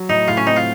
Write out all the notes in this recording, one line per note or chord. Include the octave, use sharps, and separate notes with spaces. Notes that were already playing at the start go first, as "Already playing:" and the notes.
Already playing: F#3
A2 D#4
A2 F4
C#4
C4 D#4
F4